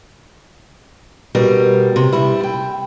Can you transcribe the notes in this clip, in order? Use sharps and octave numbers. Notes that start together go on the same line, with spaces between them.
B2 G3 A#4
C3
G3 E4
G5